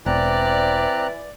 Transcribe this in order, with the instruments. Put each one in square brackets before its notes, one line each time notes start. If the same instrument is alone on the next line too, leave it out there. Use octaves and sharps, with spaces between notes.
[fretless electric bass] E1 [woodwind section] E3 D5 [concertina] C4 A#5 F#6